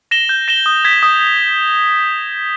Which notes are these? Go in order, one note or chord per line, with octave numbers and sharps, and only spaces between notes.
A#6 E7 G7
G6
A#6 E7 G7
D#6
G#6 B6
D#6